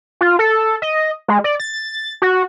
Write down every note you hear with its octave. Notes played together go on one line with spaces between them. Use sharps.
F4
A4
D#5
G#3
D5
A6
F#4